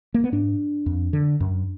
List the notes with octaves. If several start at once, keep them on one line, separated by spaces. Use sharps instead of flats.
A#3
B3
G#2 D4
F2
D3
F#2